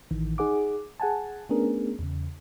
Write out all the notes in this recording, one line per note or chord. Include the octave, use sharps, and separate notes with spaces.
A1 D#3 E3
D#4 G#4 F#5 D6
G#4 F#5 G#5 A5
A3 B3 C#4 D4 G#4 A#4
E2 C#3